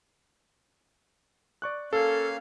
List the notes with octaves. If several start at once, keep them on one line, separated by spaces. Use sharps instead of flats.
D5 C#6 F#6
A#3 C#4 A4 F5